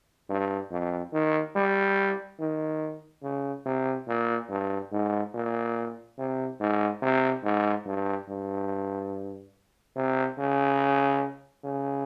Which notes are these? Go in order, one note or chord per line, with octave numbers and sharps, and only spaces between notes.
G2
F2
D#3
G3
D#3
C#3
C3
A#2
G2
G#2
A#2
C3
G#2
C3
G#2
G2
G2
C3
C#3
C#3